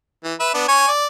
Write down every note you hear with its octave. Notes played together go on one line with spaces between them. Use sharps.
E3
B4 E5
B3 D4
C#5 G#5 C#6
D5